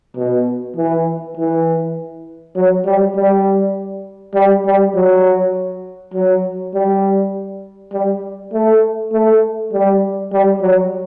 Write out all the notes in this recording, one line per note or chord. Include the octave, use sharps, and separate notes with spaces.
B2
E3
E3
F#3
G3
G3
G3
G3
F#3
F#3
G3
G3
A3
A3
G3
G3
F#3